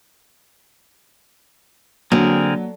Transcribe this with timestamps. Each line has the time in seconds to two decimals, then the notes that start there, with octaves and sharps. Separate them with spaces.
2.12 D3 F#3 A#3 C4 G#4 A#4